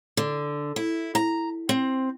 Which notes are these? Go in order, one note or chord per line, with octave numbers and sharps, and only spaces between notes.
D3
E4
A#5
C4